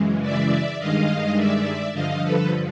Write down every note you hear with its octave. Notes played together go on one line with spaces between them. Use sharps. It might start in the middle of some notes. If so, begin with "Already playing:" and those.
Already playing: F#2 C#3 E3 G#3
D5 E5
G2 D#3 G#3 D#5 F5
D5 E5
G2 D3 F3 D#5 F5
A4 B4